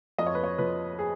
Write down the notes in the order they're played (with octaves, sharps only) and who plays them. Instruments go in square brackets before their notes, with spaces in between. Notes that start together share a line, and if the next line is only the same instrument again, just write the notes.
[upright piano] F2 D#5
C#5
B4
C#5
F3 B4
G#4